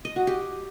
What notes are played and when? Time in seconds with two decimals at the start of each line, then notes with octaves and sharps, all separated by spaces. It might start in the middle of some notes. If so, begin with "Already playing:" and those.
0.05 D#5
0.16 F#4
0.27 G4